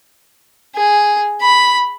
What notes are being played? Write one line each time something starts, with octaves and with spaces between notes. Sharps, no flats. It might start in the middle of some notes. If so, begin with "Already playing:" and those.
G#4
B5